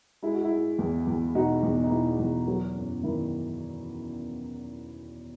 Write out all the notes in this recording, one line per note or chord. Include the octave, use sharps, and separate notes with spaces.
G#3 E4
F#4
E4
G#3
E2
E2
B2 D#4 F#4
E2
D#4
B2 E4
E2
F#3
F#2
D#3 E4